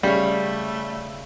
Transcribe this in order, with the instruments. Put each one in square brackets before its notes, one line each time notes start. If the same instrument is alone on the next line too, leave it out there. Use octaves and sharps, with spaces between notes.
[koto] C#3 C#5 [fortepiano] G3 [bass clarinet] A3